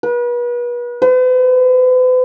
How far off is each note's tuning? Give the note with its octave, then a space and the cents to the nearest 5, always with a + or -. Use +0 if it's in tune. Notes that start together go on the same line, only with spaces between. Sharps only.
B4 -35
B4 +45